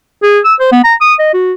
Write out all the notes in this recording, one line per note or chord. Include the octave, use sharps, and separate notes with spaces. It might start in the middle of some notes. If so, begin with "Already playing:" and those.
G#4
E6
C5
B3
A#5
D#6
D#5
F#4